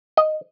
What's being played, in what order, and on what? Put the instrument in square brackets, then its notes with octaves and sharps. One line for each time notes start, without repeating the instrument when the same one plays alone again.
[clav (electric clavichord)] D#5